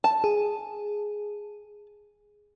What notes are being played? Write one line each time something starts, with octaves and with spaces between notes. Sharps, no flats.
A5
G#4